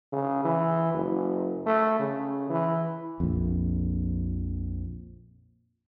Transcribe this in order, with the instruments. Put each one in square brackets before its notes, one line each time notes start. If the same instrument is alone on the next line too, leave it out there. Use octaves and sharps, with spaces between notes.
[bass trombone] C#3
E3
F#1
A3
C#3
E3
[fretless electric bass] A#1 F2